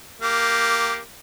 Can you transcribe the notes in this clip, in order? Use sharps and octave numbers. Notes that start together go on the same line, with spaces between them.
A#3 G4